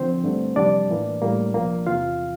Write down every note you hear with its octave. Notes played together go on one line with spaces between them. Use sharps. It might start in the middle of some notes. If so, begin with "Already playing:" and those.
Already playing: D3 F3 C4 C5
G2 D3 A3
F2 C3 E3 G3 D4 D5
A2 E3 A#3
A2 G3 A#3
C2 A#2 F3 A#3
E2 C3 E3 F4 F5